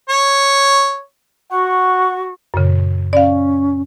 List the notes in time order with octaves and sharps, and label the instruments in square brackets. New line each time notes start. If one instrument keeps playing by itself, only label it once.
[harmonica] C#5
[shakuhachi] F#4 [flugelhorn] F#5 [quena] C#6
[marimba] F#2 A#2 C#3
[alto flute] C#4 [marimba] D5 F5